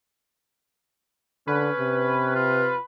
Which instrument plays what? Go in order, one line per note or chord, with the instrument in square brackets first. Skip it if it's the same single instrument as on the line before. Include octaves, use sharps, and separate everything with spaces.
[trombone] D3 [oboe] C#4 [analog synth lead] B4
[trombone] C3
[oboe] F4